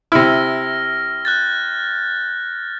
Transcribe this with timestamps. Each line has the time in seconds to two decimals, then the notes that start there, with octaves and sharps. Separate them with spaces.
0.12 C3 E4 F6 A#6
1.25 F#6 G6 A6